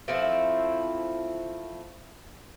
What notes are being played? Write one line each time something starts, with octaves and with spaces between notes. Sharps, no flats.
F3 A3 C4 E4